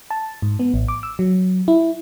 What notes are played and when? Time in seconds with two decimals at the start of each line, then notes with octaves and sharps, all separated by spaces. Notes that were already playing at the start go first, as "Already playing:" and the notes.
0.11 A5
0.42 G#2
0.59 B3
0.74 A1
0.88 D6
1.03 E6
1.19 F#3
1.68 E4